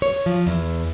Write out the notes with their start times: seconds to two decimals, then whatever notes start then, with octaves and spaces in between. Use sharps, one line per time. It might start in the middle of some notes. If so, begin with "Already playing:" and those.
0.02 C#5
0.26 F3
0.47 E2